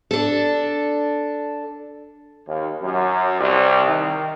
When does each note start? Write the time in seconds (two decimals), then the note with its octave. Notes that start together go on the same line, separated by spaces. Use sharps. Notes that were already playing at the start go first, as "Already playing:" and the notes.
0.11 D4 A4
2.46 D#2
2.81 F#2
3.39 C2
3.87 D#3